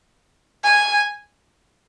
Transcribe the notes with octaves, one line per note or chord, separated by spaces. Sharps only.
G#5